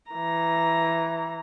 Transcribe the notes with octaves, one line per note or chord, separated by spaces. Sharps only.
E3 A#5